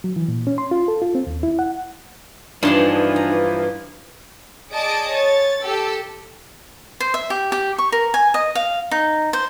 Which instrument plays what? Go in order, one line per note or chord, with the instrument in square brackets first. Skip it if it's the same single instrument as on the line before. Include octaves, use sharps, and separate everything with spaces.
[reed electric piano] F#3
E3
A#2
C#4
C6
F4
A4
F4
C4
D#2
E4
F#5
[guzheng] G2 A5 C6 [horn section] E3 F3 [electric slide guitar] D4 D#4
[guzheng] A#5
[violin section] G#4 D5 D#5 A5 D#6 D7
C#5 A6
G4 A4 E6
[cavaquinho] C5
E5
G4
G4
C#6
A#4
G#5
D#5
F5
D#4
C5